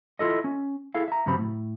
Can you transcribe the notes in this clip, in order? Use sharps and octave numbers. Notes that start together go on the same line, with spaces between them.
E4 F4 A4 D#5
C#4
E4 G#4 A4 E5 F5
E5 A#5
G2 C#3 F#3 G3 C4 B5
A2